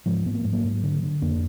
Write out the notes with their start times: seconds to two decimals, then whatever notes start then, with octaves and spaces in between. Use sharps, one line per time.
0.06 G#2 F3 G#3
0.26 G#2 B3
0.35 A#3
0.44 G#2 G#3
0.53 F#3 A#3
0.64 G#2
0.83 D3
1.03 D3
1.22 F2 A#3 D4